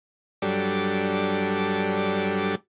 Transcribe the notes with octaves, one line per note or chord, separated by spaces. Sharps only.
G2 F#3 G3 D4 A4